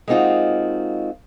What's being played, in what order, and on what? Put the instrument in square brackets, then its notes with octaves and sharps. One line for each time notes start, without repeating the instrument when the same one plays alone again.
[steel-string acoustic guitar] G#3 A#3 C4 D#4 F4 F#4